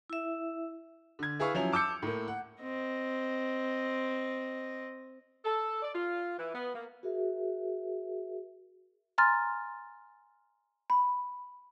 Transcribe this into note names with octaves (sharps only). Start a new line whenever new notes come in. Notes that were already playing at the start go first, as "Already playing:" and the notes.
E4 E5
D3 G#6
E4 G#4 B4 E5 F5 C#6
F3 F#3 C#4 E4 G#5 F7
A5 D6 E6 G6 C#7
A2 A#3
F#5
C4 D#5
A4
D5
F4
E3
B3
A#3
F#4 G#4 A#4 E5
G#5 A#5 C6 F6 A6
B5